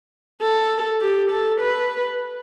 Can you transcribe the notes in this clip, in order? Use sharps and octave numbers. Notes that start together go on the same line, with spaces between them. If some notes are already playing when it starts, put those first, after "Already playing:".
A4
G4
A4
B4